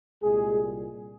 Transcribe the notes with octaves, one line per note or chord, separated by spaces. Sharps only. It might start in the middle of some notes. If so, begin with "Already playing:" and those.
C2 A#2 G3 G#3 G#4